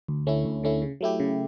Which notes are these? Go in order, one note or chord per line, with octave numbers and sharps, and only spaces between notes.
D2
D3 A3 C#4 E4
D2
D3 A3 C#4 E4
C#3
F#3 A3 E4 G4
C#3